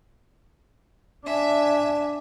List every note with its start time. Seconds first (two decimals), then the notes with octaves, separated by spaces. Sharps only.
1.26 D4 E5 G#5